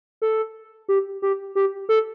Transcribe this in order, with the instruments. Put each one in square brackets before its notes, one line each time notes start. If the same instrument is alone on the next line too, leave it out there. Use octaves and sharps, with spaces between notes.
[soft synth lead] A4
G4
G4
G4
A4